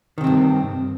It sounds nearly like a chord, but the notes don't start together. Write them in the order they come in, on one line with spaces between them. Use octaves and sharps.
D#3 C3 C4 G2